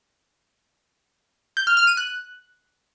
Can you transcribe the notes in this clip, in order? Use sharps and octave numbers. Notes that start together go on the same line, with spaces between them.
G6
F6
F6
D#7
F#6